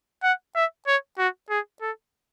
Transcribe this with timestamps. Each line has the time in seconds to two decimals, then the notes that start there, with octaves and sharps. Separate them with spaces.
0.23 F#5
0.55 E5
0.87 C#5
1.19 F#4
1.50 G#4
1.81 A4